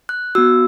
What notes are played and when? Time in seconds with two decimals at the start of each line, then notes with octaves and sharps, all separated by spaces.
0.09 F#6
0.35 B3 F#4 E6